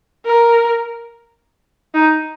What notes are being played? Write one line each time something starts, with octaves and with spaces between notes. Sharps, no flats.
A#4
D#4